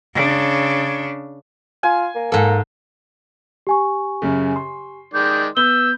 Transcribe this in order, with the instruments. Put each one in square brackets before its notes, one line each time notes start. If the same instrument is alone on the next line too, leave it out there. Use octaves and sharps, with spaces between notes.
[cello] C#3 D4
[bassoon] F4 [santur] G#5
[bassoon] A#3
[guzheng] G#2 A4 [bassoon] A#3
[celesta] G4 G#5 C#6
[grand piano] F#2 C#3
C6
[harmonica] D#3 G#3 D5 [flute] G6
[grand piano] B3 [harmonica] E6 [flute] G6 [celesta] G7